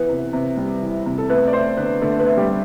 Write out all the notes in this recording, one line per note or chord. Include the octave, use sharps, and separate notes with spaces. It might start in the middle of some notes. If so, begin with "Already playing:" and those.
Already playing: E3 B3 B4
C3
C3
G3
E3
C3
A4
A3 B3 B4
D5
A3 C4 C5
D3 B3 B4
D3 A3 A4
B3 B4
A3
G3 G4
A3